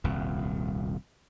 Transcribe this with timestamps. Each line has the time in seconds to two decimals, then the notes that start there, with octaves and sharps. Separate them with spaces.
0.04 D#1 C2 F2